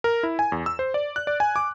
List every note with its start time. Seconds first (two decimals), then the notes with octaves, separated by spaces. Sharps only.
0.04 A#4
0.23 E4
0.39 G#5
0.52 E2
0.66 E6
0.79 C5
0.94 D5
1.16 F#6
1.27 D5
1.40 G#5
1.56 D6